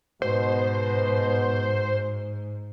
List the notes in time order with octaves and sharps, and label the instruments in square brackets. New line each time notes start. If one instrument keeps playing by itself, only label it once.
[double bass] G#2 [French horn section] B2 B3 [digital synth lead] C5